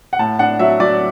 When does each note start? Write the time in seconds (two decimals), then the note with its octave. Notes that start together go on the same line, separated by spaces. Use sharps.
0.13 F#5
0.19 A2 A5
0.39 D4 F#5
0.59 F#3 E5
0.80 F#3 D5